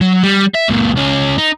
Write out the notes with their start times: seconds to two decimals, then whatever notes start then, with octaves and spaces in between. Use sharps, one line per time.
0.01 F#3
0.23 G3
0.55 E5
0.69 C#2 A#2
0.96 C#2 C#4
1.38 D#4